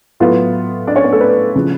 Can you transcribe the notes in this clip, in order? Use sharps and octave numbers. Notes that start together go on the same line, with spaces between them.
A2 F#3 B3 F4 F5
D4 D5
C#4 C#5
B3 B4
A3 A4
B3 B4
C#3 F3